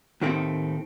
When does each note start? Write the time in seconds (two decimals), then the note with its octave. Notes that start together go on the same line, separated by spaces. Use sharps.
0.21 D#2 A2 D#3 A3 C4